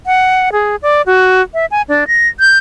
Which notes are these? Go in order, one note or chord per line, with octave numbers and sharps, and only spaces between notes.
F#5
G#4
D5
F#4
E5
G#5
D4
A#6
G6